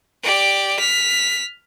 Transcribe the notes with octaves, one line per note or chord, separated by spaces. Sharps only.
G4 D5
F6 B6